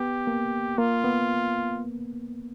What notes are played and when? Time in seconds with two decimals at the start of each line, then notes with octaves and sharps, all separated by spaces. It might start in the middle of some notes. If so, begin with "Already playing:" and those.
Already playing: B3 G4
0.27 A#3
0.78 A#3 F4
1.04 B3